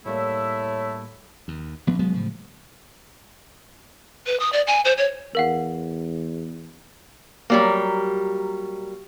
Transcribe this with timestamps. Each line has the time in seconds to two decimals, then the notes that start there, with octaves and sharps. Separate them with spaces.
0.06 A2 G3 A3 A#3 E4 C#5
1.48 D#2
1.87 A#1 G2 F3 B3
1.99 F1 F#3 G#3 B3
2.14 A2 C#3 F3
4.27 B4
4.40 D#6
4.53 D5
4.67 G#5
4.85 C5
4.98 C#5
5.35 E2 A#4 F5 F#5
7.50 F#3 G3 A#3